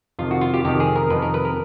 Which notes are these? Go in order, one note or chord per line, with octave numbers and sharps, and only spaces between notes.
F2 C3 D#3 F4
F#4
F4
G4
F2 C3 D#3 G4
G#4
A#4
F2 C3 D#3 B4
A#4
B4
A#4